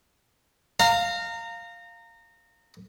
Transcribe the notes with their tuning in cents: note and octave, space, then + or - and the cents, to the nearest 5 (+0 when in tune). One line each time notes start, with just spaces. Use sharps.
F5 +0 A#5 -25